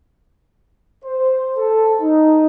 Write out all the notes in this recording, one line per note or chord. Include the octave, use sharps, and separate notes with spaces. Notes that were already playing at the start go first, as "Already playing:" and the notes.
C5
A4
D#4